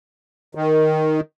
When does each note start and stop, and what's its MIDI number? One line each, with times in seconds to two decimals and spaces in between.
0.55 1.20 51